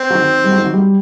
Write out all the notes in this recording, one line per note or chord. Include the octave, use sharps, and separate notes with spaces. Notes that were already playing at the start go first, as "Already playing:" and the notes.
Already playing: C4
F#3
D#3
G3
F#3
D#3
F#3
G3